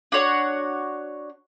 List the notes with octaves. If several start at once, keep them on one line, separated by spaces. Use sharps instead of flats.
D4 F#4 C#5 F#5